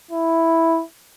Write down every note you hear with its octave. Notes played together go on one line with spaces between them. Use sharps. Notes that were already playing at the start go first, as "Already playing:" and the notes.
E4